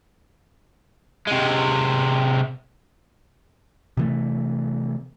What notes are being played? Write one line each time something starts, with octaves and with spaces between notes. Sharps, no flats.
C3 G#3
C3 E3 A3